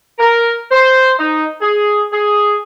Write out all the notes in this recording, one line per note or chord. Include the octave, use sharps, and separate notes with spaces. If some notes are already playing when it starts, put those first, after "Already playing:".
A#4
C5
D#4
G#4
G#4